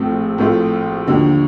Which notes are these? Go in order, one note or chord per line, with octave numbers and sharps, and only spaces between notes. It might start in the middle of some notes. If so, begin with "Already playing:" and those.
Already playing: A#1 A2 A3 C4 F4
A#1 A2 A3 C4 F4
D#2 D3 F3